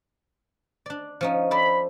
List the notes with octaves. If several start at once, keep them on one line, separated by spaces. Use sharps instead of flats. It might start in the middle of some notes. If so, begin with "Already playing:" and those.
D4 D5
F3 C#4 D#4
A4 C5 D5 B5